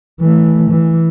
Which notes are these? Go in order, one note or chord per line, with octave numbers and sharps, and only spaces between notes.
E3 A3
E3